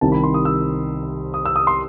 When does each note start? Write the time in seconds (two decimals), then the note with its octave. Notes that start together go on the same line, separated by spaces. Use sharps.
0.01 C2 C3 D#3 G3 C4 A5
0.12 B5
0.24 C6
0.34 D#6
0.45 E6
1.34 D#6
1.45 E6
1.56 D#6
1.67 C6